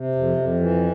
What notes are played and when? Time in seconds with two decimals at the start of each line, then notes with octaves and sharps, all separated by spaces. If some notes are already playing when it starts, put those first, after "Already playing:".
Already playing: C3
0.15 F2
0.37 F2
0.59 E3